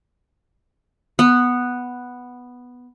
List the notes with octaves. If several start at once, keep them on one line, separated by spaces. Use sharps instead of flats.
B3 F#5